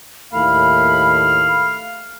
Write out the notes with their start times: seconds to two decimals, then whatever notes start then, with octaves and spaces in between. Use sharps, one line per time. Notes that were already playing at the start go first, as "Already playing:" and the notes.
0.33 D#2 A2 A3 F5 B5